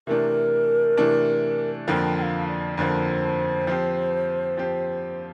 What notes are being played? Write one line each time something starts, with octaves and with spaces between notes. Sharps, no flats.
C3 E3 A3 D4 A#4
C3 E3 A3 D4
F2 D3 F3 A#3 G5
G5
F5
D5
F2 D3 F3 A#3 C5 D5
F3 C4 G4
F3 C4 G4